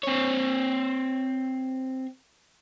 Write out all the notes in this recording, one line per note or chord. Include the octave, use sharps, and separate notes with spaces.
C4 C#5